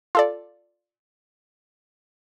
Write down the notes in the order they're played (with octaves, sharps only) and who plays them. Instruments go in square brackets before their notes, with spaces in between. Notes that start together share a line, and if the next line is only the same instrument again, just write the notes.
[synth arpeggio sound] F4 A4 D5